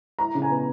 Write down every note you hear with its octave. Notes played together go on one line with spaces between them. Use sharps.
E4 A#5
C#3
G#5
B3